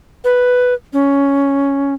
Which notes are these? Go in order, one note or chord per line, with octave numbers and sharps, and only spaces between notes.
B4
C#4